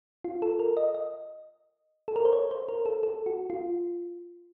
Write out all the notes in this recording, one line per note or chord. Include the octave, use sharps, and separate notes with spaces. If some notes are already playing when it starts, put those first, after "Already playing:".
F4
A4
A#4
D#5
D#5
A4
A#4
C5
C#5
C5
A#4
A4
A4
F#4
F4